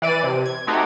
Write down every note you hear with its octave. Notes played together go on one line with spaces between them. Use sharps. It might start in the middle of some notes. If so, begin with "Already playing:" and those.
E3 D5 D#7
C3
G#6
A3 C4 D#4 F#4 G4